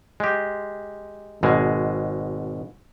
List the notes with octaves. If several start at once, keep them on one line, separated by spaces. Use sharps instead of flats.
G#3 G4
G#1 B2 G#3